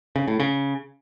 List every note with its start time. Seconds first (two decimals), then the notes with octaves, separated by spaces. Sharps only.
0.16 C#3
0.28 A2
0.40 C#3